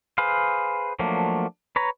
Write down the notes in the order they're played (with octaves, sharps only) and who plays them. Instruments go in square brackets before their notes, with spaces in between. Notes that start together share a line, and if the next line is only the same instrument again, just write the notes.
[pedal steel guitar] G#4 B4 C5 F5
F3 F#3 A3 A#3 D4
B4 C#5 A#5